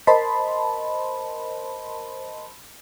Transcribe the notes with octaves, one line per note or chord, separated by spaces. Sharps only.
A#4 C5 D#5 A5 B5 C6